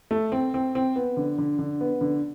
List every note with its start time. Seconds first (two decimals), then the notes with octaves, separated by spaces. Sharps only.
0.11 A3
0.32 C4
0.54 C4
0.75 C4
0.96 B3
1.17 D3
1.38 D3
1.59 D3
1.81 B3
2.01 D3